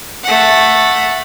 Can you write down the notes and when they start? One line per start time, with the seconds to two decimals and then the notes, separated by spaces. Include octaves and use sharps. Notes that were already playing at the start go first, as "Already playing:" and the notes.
0.24 A3 F#5